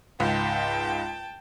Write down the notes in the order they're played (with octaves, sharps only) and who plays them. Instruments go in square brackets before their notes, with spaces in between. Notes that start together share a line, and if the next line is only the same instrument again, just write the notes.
[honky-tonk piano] C#2 G#2 [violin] G5 A5